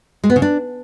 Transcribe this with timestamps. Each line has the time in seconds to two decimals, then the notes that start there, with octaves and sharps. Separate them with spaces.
0.24 G#3
0.30 B3
0.36 C#3
0.42 D4